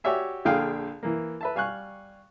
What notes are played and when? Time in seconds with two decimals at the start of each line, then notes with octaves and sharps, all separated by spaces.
0.04 F#4 G4 C#5 D5 E5 G#5
0.45 A#1 D3 G#4 F5 G5
1.03 E3 A#3
1.41 B4 E5 A5
1.55 G3 F5 G#5 C#6 F#6